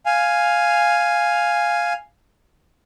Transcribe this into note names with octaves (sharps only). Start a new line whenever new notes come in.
F5 G#5